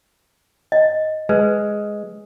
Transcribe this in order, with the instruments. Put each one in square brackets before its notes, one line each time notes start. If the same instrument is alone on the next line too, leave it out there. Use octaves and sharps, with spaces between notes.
[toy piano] D#5
[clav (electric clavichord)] G#3 [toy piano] B4